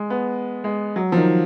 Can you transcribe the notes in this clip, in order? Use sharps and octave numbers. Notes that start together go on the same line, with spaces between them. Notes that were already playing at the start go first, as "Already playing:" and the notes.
Already playing: G#3
B3
G#3
F#3
F3
D#3